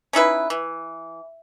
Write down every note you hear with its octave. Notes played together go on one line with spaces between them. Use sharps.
C#4 D#4 E4 B4
E3